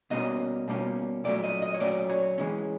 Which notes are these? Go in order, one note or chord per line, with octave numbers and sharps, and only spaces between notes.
B2 G3 A#3 C#4 D#5
B2 G3 A#3 C#4
A#2 F#3 A3 C#4 D5
D#5
D#5
C#5
A#2 F#3 A3 C#4 D5
C#5
E3 G#3 C#4